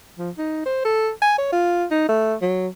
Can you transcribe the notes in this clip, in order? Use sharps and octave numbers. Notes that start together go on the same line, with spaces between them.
F3
D#4
C5
A4
G#5
C#5
F4
D#4
A3
F#3